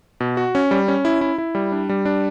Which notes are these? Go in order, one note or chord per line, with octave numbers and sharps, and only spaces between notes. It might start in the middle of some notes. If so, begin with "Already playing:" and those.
B2
F#4
C#4
G3
C#4
E4
E4
E4
G3
D4
G3
D4